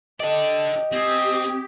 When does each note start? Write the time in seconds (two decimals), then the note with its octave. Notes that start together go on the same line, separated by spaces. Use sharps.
0.20 G4 A4 D5 D#5
0.92 C4 G4 G#5 D#6